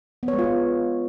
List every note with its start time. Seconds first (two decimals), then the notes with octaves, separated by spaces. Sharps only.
0.23 B3
0.28 C#5
0.33 G#3
0.39 F4
0.44 B3